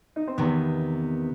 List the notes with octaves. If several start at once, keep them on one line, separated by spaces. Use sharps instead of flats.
D#4
C4
E2 C3 D#3 B3